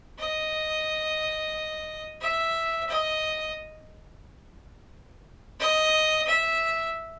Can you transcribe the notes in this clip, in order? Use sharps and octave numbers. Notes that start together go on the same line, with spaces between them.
D#5
E5
D#5
D#5
E5